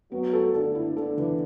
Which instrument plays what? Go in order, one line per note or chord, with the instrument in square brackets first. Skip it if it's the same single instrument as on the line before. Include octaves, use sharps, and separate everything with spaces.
[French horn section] F#3 F#4 [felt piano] B3
[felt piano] A4
[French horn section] D3 D4 [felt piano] A4
[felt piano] E4
[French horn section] D3 D4 [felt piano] A4
[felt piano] E3